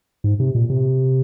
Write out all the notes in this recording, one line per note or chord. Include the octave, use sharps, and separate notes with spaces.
G#2
C3
A#2
C3